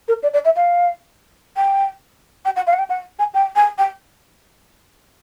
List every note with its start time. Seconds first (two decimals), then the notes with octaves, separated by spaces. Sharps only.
0.08 A#4
0.23 D5
0.34 D5
0.45 E5
0.56 F5
1.57 G5
2.45 G5
2.56 F#5
2.67 F5
2.73 F#5
2.79 G5
2.89 F#5
3.19 G#5
3.34 G5
3.56 G#5
3.78 G5